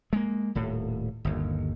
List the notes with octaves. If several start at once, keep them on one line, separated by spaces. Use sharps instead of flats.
G#3 A#3
D#1 A2
G1 D#2